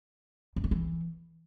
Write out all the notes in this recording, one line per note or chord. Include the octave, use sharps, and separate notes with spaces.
F#2
D#3
E3